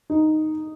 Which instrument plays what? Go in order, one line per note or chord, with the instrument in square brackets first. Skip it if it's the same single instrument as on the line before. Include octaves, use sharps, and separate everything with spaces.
[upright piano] D#4